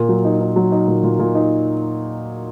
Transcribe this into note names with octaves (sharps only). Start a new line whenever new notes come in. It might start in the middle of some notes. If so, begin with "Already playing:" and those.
Already playing: A#2 A#3
F#3
D#4
D#4
F#3
D#4
A#2
A#2
A#2
D#4